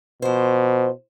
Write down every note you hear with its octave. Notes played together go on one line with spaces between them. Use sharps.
B2 F3 C5